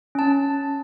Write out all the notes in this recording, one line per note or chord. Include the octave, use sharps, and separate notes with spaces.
C#4 A5